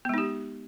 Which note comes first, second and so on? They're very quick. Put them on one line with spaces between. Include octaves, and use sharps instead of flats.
B3 G#3 D#4 G4